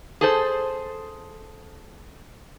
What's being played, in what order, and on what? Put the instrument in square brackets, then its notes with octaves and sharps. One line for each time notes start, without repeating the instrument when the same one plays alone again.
[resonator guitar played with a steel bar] G#4 A4 C5